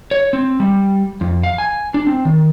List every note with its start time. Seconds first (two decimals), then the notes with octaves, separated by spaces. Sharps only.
0.11 C#5
0.33 C4
0.60 G3
1.21 F2
1.43 F5
1.58 G#5
1.94 D4
2.07 C4
2.25 D#3